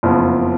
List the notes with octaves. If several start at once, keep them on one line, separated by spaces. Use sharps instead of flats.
F#1 F2 F3 B3